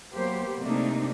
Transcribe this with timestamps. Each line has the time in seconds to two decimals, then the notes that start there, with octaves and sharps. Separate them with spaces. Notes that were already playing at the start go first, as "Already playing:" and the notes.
0.14 F#3 A#3 B3 G4 C5
0.62 C3 A3 A#3 D4 D#4